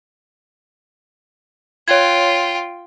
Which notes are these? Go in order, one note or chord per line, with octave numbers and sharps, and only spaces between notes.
F4 C#5 G5 G#6